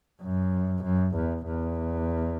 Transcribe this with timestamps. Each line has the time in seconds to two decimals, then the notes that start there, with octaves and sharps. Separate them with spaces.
0.22 F#2
0.84 F#2
1.16 E2
1.46 E2